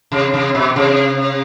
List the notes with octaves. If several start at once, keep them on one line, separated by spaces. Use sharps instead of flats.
C3
C3
B2
C3